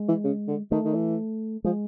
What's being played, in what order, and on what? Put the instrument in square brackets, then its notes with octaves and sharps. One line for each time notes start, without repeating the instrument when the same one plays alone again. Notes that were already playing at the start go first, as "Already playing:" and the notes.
Already playing: [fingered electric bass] G#3
[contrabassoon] E3
C#3
D3
[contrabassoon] D#3 [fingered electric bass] A3
[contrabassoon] D#3
E3
[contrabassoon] F3 [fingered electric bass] G#3